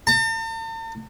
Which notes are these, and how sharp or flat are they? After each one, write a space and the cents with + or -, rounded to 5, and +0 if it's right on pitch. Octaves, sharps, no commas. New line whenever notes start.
A5 +45